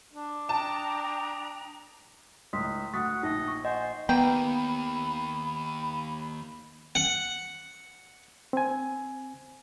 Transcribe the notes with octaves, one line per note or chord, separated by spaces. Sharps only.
D4
G5 A5 A#5 D#6
C#2 A2 C6 D#6 B6
D2 F#5 C#6 D#6 A6 B6
A#1 D#4 D#5
C#6
C5 D#5 F#5 G#5
D#2 A#3 B3 G5 B5
F#5
C4 G#5